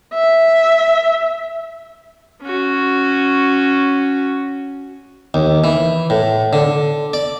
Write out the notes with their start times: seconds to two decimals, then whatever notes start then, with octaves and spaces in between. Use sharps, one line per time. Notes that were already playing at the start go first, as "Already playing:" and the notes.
0.14 E5
2.43 C#4 F#4
5.34 D#2
5.64 E3
6.10 A2
6.53 D3
7.13 D5